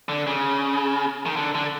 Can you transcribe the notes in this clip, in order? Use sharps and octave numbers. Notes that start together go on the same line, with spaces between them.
D3
C#3
D#3
D3
D3